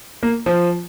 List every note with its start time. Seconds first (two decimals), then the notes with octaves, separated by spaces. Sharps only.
0.23 A#3
0.46 F3